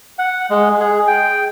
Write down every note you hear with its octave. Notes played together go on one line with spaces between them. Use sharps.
F#5
G#3
G#4
G5